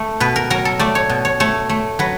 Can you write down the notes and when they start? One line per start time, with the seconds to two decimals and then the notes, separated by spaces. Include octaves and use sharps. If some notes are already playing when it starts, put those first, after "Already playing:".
Already playing: A3
0.20 B2 B4
0.36 A#4
0.50 F#3 A#4
0.65 A4
0.79 A3 D5
0.95 C#5
1.09 B2
1.25 C#5
1.40 A3 C#5
1.69 A3
1.99 F#3 B4